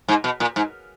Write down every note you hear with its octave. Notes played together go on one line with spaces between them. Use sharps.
G#2
B2
A#2
G#2